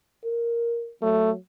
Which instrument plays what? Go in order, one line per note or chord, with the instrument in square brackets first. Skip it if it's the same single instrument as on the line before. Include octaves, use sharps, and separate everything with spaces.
[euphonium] A#4
[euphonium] F#3 [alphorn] A3